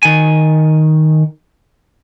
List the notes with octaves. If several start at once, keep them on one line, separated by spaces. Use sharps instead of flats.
D#3 G#5